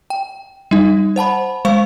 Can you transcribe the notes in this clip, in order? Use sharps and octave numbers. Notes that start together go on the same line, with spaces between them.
G5
G3 D#4
C5 F#5 A5 B5
G#3 C5 F5 C#6